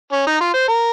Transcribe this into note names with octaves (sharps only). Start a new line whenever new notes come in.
C#4
D#4
F4
C5
A#4